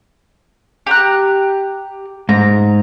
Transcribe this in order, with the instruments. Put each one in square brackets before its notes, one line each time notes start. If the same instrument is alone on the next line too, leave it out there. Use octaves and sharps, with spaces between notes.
[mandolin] G4 A#5 F#6
[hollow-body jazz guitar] G#2 [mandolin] A#5